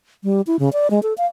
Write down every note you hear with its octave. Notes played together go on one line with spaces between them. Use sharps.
G3
E4
C#3
D5
G#3
A4
F5